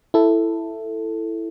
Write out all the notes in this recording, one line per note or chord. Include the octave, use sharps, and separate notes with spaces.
E4 A4